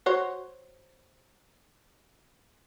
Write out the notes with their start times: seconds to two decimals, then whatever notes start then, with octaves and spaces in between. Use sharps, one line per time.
0.06 F#4 C5 C#5